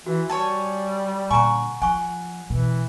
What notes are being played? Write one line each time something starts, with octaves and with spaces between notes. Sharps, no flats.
E3 F#4
G3 C#5 G#5 A5
A#2 D3 F#5 G#5 A#5 C#6
F3 F#5 G#5 C#6
B2 E3